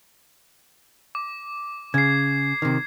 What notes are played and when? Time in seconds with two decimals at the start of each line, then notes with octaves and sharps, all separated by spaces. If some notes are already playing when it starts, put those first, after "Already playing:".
1.15 D6
1.94 C#3 G#6 C7
2.62 C3 D#3